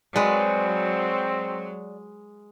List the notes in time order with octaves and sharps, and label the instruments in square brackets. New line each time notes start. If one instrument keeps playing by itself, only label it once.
[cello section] F#3 [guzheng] G#3 B4 [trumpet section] C4 [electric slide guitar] D5